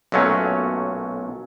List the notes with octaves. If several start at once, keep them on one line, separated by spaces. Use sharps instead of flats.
B1 A#2 F#3 A3 C#4